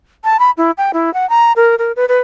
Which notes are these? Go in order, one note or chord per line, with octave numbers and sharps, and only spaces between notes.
A5
B5
E4
G5
E4
F#5
A#5
A#4
A#4
B4
B4